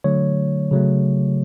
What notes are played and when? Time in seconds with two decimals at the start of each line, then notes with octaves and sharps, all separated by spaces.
0.04 D3 F#3 A3 C#5
0.71 C#3 F#3 A3